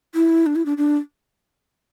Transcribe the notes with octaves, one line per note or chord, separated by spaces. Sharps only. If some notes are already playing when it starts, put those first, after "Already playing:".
E4
D4
E4
D4
D4